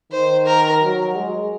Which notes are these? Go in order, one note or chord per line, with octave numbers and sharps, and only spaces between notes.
D#3 C5
A#4
F#3
G#3